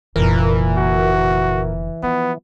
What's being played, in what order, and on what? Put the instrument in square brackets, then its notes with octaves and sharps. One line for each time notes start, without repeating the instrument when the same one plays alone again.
[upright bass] F1 D3 [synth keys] A#2 A#4 [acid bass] E3
[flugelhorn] F#4
[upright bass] F3 [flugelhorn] B3